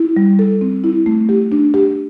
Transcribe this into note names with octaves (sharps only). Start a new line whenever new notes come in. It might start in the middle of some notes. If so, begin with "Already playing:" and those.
Already playing: E4
G3
A4
C4
E4
A3
G4
D4
G4